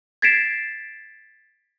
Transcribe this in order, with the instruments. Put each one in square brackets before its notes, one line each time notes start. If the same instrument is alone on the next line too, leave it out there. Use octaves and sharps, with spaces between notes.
[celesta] G#6 A6 B6 C7 D7 E7